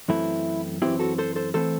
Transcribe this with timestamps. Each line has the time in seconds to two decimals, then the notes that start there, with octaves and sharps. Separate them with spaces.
0.08 F#2 E3 A3 C4 E4
0.82 F#2 E3 A3 C4 E4 G4
0.99 F#4 A4
1.18 A4 C5
1.36 A4 C5
1.54 E3 A3 C4 A4 C5